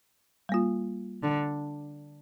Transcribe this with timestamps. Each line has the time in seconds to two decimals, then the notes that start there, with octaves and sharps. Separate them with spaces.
0.49 G3 A#3 F4
1.23 D3